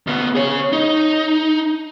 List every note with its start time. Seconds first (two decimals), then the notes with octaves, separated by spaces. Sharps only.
0.07 D2 B3
0.35 G#4 C#5
0.73 D#4